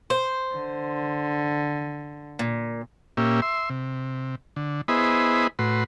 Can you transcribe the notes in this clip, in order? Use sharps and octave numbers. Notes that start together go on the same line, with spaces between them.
C5
D3
A#2
A#2 A#3 C#4 G4 E5
E5 C6
C3
D3
B3 E4 G#4 C5 D#5 B5
A2 F#4 B4 C6